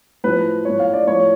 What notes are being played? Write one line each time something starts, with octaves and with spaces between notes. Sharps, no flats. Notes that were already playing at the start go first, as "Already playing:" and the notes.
A2 F3 B4
A2 F3 C#5
F5
D5
A2 F3 C#5